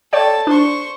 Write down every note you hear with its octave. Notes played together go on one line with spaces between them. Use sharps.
A4 C#5 D5 G5 A5
D4 C5 C#6